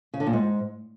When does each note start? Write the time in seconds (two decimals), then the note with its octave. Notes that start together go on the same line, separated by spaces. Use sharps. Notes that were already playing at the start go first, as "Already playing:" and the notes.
0.14 C#3
0.20 D3
0.27 A#2
0.33 G#2